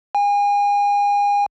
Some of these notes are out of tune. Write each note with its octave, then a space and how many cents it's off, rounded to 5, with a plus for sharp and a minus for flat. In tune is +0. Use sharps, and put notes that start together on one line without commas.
G#5 -35